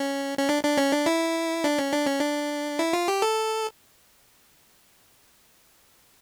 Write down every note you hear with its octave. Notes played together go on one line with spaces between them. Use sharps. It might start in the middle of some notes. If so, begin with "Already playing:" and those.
Already playing: C#4
C#4
D4
D4
C#4
D4
E4
D4
C#4
D4
C#4
D4
E4
F4
G4
A4